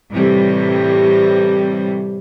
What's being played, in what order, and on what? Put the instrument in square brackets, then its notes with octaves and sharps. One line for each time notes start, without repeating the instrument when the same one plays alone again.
[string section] A2 C3 E3 G3